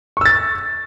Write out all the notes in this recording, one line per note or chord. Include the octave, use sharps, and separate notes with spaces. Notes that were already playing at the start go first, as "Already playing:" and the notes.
C#6 E6 A6